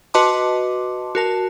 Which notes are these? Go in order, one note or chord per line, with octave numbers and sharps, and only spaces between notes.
F#4 B4 D#5 A5 C6 D6
F#4 A#4 A5